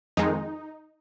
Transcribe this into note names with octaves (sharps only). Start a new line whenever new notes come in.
F2 D#3 G#3 D#4